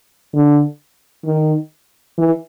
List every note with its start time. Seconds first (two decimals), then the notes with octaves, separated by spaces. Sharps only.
0.34 D3
1.25 D#3
2.18 E3